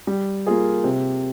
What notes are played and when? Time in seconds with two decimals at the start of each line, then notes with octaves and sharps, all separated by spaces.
0.07 G3
0.47 A#3 F4 G#4
0.84 C3